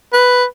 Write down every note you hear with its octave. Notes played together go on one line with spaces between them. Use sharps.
B4